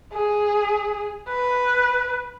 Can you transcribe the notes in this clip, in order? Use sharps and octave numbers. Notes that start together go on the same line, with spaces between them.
G#4
B4